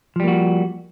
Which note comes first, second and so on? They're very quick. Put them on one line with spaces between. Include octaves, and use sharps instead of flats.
F3 G3 A#3 F#4